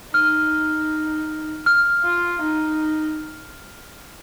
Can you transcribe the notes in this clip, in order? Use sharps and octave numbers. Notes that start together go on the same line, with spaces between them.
D#4 F6
F6
F4
D#4